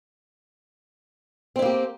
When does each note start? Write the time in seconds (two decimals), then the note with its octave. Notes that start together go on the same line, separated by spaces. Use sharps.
1.56 C4
1.59 E4
1.62 A#3
1.66 G4